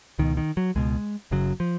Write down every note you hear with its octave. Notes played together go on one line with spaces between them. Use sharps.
C#2 B2 D#3
D#3
F#3
C#2 B2 G#3
F#1 F#2 C#3 F#3
F3